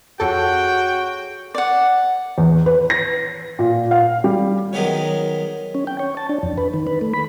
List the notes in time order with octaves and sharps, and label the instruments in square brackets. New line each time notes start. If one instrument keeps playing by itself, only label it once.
[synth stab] F2 A4 [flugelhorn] F#4 [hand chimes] G#4 C#5 F#5 [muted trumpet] G5
[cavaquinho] D5 F#5
[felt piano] E2
B4
A#6
A#2
F5
G3
[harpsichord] D#3 F#3 G#3 B3 B4 C#5
[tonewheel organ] C#4
G5
C#5
A5
D4
F2
B4
D#3
B4
A3
B5